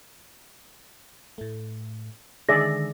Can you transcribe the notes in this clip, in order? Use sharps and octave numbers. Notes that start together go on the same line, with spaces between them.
A2 A3
D3 D#3 G#3 G#4 D5 E5 A#6